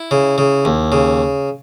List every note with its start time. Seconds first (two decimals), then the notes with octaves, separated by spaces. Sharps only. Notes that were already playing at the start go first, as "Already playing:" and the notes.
Already playing: E4
0.11 C#3
0.38 C#3
0.65 D#2
0.92 C#3